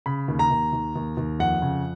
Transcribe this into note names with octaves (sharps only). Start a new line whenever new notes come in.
C#3 B5
D#2
A#5
D#2
D#2
D#2
D#2
F2 F#5
C#3